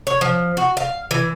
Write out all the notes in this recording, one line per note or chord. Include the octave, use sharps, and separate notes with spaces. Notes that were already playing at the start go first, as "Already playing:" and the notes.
C#5
F3
F#4
F5
E3